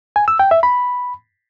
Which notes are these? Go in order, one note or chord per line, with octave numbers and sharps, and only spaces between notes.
G#5
E6
G5
E5
B5